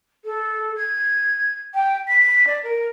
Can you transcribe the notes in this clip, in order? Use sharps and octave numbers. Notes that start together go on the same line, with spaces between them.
A4
G#6
G5
B6
D5
A#4